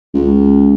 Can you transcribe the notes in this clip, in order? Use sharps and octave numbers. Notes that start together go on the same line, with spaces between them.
C#2